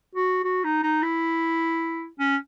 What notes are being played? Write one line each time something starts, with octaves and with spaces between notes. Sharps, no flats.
F#4
F#4
D#4
D#4
E4
C#4